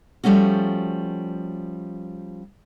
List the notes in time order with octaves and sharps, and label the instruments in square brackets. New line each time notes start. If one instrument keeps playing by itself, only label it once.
[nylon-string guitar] F3 G3 A3 C#4 F#4